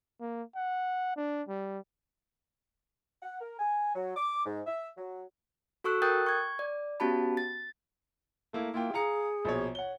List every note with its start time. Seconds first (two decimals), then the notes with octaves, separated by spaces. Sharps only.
0.21 A#3
0.55 F#5
1.17 D4
1.49 G3
3.22 F#5
3.41 A#4
3.59 G#5
3.95 F#3
4.17 D6
4.45 G#2
4.66 E5
4.97 F#3
5.84 F#4 A4 C#6 E6 F#6
6.02 A#4 G5 D#6 F#6 G6 A6
6.26 C#6 G#6
6.59 D5
7.00 B3 C#4 F#4 G4 A5 B5
7.37 A6
8.53 A3 A#3 E4
8.74 A#3 E4 F4 G5
8.94 G#4 F5 A#5 C#7
9.45 A#1 B2 C#5
9.75 C#5 F#5 G7